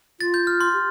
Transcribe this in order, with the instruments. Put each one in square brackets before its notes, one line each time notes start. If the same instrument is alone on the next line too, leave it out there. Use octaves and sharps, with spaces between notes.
[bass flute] F4 [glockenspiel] A6
[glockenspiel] G6
F6
C6
[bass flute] G4